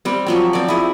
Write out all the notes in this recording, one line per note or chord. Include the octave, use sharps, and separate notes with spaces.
G3 C4
F3 F#3 C4
C4 D5
E4 G#4